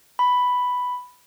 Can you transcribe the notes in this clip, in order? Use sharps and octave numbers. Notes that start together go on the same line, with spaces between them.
B5